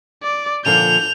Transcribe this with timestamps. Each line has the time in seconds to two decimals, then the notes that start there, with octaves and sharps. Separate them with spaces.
0.23 D5
0.65 A#2 D3 F3 G6 F7